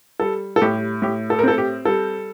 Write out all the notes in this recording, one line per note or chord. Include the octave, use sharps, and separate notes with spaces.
G3 A4
A4
A2 G4
A2 G4
A4
A#4
C4 A4
G4
G3 A4